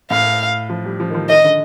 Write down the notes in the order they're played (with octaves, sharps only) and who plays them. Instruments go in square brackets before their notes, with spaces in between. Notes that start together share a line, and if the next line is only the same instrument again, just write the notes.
[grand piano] A2 [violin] F5
[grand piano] F3
G3
F3
D#3
F3
[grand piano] D#3 [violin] D#5
[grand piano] D3